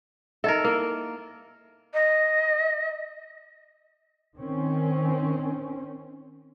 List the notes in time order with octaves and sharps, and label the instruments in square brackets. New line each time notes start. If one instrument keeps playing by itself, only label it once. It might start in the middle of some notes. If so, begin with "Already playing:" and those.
[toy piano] D#4 D#5 E5 [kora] A4 A#4
[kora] A#3 [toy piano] E4 A#4
[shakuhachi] D#5
[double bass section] D#3 C4 C#4